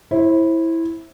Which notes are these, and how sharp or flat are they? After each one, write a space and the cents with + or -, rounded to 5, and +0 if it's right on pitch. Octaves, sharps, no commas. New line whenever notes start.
E4 -5 C5 +30